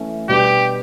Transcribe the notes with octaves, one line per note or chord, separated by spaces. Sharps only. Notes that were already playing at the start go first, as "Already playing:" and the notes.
Already playing: E3 A3 C#4 E4
B2 G3 B3 D4 G4